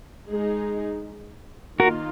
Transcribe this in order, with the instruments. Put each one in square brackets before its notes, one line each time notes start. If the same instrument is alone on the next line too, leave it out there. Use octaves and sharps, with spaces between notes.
[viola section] G#3 D#4 G#4
[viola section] D#3 A#3 F4 [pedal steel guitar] F#4 A#4